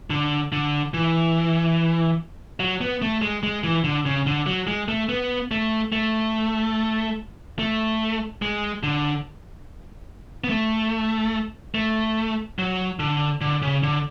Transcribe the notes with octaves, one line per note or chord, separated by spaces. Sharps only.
D3
D3
E3
F#3
B3
A3
G#3
G#3
E3
D3
C#3
D3
F#3
G#3
A3
B3
A3
A3
A3
G#3
D3
B3
A3
A3
F#3
D3
D3
C#3
D3